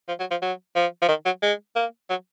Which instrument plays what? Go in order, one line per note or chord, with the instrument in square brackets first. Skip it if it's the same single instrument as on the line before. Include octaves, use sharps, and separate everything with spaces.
[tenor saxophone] F3
F#3
F3
F#3
F3
F3
D#3
F#3
G#3
A#3
F#3